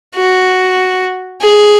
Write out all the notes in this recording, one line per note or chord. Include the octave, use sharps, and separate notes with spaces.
F#4
G#4